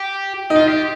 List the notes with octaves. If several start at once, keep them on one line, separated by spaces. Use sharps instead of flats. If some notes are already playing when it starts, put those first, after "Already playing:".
Already playing: G4
D#4
F4
G4